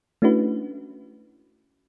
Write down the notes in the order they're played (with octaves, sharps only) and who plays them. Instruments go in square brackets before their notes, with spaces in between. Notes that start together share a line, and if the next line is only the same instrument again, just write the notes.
[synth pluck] A3 C#4 D4 E4 F#4 B4